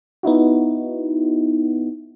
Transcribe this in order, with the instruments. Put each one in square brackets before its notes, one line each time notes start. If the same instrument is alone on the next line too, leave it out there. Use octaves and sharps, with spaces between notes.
[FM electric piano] B3 D#4 E4 F#4